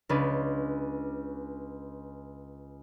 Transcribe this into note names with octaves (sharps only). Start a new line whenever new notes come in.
C#2 C#4 D4 B4